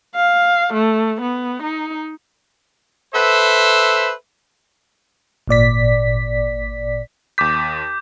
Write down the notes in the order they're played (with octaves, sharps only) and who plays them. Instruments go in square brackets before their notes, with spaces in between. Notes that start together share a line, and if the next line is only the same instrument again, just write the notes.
[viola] F5
A3
B3
D#4
[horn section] A4 B4 C5 E5
[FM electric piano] G#1 A#2 D5 B6
[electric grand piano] D#2 B6 [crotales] D6 G6